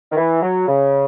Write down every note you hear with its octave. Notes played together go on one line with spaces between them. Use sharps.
D#3
E3
F#3
C#3